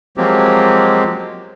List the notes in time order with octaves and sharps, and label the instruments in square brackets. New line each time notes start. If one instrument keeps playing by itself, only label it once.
[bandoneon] F3 F#3 G#3 A#3 C4 G4